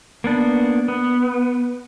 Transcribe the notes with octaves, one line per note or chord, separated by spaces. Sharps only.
A#3 B3 D4
B3